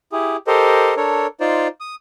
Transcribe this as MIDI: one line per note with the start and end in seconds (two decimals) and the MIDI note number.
0.12 0.37 64
0.12 0.37 67
0.12 0.37 68
0.47 0.94 67
0.47 0.94 69
0.47 0.94 70
0.47 0.94 72
0.47 0.94 75
0.97 1.27 62
0.97 1.27 69
0.97 1.27 70
0.97 1.27 73
1.40 1.68 63
1.40 1.68 65
1.40 1.68 72
1.40 1.68 74
1.80 1.95 87